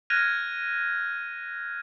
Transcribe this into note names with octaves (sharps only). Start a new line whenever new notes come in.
F6 F#6 G#6 A#6 D#7 F7